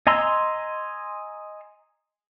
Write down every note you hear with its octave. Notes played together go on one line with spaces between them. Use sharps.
D#5 G#5 A#5 C6 E6